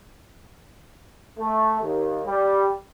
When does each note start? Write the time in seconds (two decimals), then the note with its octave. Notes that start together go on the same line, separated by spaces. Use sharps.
1.39 A3
1.80 D#2
2.25 G3